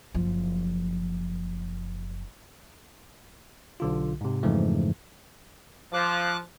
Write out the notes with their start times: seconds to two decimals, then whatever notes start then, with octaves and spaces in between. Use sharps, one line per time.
0.14 F#1 F3
3.80 B1 D3 F4
4.21 G#2 C3
4.43 F2 G#2 C#3 E3 F3 A3
5.93 F3 D6 F#6